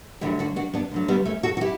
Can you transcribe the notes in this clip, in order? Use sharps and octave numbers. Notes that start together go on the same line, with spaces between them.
D2 D3 F#3 E4 G4
D4 F#4
D4 F#4
B3 D4
D2 D3 F#3
G3 B3
A3 C#4
F#4 A4
F#4
E4 G4